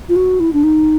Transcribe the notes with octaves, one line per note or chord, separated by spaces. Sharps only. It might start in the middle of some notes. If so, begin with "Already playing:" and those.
F4
F#4
E4
D4
D#4